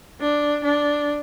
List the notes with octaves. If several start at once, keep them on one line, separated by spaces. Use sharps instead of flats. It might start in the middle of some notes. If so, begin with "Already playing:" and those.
D4
D4